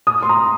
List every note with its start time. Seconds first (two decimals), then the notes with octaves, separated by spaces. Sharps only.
0.07 D#6
0.23 C6
0.29 A#5